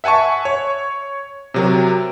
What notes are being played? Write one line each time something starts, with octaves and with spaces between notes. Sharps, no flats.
E5 F#5 G#5 A5 C#6
C#5
C3 F#3 A#4